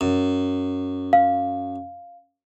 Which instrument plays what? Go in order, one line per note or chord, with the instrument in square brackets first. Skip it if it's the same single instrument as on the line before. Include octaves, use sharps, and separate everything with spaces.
[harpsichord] F#2
[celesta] F5